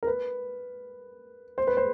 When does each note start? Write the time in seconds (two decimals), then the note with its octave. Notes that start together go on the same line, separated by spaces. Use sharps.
0.03 A#4
0.07 B4
1.58 C5
1.67 B4
1.77 C5